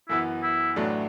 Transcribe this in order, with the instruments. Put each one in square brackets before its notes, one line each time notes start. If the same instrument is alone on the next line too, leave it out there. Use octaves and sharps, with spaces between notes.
[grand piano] F#2 E3 B3 [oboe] E4
[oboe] E4
[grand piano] A1 A2 F#3 A3 D4